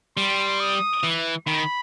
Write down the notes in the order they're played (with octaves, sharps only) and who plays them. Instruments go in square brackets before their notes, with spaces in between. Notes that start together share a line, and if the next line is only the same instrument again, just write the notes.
[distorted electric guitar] G3 [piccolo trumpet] C6
[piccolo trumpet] D#6
[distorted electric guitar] E3
[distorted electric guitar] D#3 [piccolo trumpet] B5